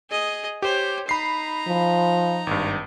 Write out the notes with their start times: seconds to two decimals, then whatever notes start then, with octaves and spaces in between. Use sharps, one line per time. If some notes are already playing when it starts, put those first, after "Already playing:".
0.10 G#4 D#5
0.62 G4 C5 C#5
1.09 D#4 A#5 B5 C7
1.67 F3
2.47 G#1 G2